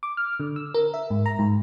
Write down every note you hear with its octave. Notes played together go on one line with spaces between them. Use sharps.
D6
F6
D3
E6
A#4
E5
G#2
A#5
G#2